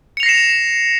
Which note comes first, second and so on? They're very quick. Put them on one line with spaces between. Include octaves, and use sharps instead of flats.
C#7 F7 A#6 C7 E7